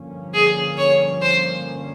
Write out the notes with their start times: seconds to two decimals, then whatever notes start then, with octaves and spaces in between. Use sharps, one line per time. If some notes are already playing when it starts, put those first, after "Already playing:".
Already playing: G2 D3 F3 A#3 C#4
0.34 G#4
0.78 C#5
1.22 C5